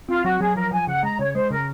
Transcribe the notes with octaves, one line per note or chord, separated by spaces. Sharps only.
C4 F4
F#3 F#4
F#3 G#4
F3 A#4
F3 G#5
C#3 F#5
G#3 A#5
C#3 C#5
G#3 C5
C#3 A#4